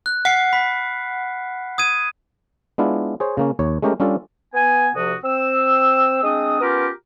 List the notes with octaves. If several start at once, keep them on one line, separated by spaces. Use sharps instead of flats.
F#6
F#5 F6 C7 C#7
B5 B6
D#6 G#6 D#7
G#3 B3 D4 E4 F4
G#4 C5 C#5
C#3 A#3 C#4
D#2 C#5
G#3 A3 C#4 G4 A#4
G3 C#4 D4 F4 A4
B3 G#5
D2 C3 F3 F#4 D#6
C4 E6
G#3 C4 D4 D#6
B3 C#4 F4 G4 A#4